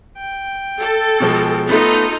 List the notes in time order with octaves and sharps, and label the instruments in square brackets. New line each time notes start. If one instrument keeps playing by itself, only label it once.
[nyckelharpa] G5
[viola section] A4
[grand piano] B2 F3 G#3
[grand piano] A3 B3 [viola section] D#4 [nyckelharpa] F4 A4